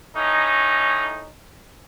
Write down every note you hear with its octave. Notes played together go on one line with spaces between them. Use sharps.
A2 C#4 D#4